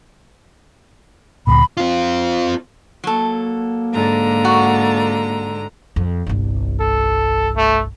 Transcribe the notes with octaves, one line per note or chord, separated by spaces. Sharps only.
D2 A#2 B5
C4 F4
F#3 A#3 A4
G#2 D3 A#5
F#4
F2
G1 C2
A4
A3